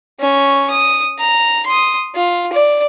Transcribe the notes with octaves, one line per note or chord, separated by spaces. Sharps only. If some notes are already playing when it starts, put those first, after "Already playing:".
C#4 C#6
D#6
A#5
C6 D#6
F4
D5